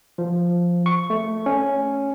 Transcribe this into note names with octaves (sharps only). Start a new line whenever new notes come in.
F3
C#6
A3
C#4